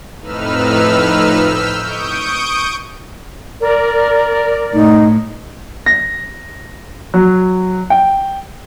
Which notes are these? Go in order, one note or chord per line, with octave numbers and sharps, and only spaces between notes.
F2 A2 D#4 B4 E6 F6
E6 F6 G6 B6
C#6 D#6 G6 D7
A#4 D5
A2 D#4
A#6
F#3
G5